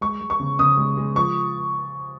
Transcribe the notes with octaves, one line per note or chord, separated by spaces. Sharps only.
G#3 C#6
G#3
C#6
C#3
C#3 D#6
G#3
G#3
F3 C#6